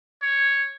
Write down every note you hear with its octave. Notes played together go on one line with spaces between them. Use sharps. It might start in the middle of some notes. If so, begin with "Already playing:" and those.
C#5